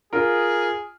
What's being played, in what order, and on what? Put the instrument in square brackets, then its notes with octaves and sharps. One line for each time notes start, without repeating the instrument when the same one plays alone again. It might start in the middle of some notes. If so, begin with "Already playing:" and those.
[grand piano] F4 A#4 [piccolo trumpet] G#4